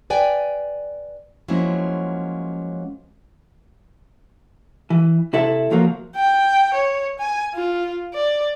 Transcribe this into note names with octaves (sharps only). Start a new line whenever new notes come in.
B4 D5 G5 G#5
F3 F#3 G#3 A#3 C#4 E4
E3
C3 E4 A4 E5
C#2 F3 F#3 A#3
G5
C#5
G#5
F4
D5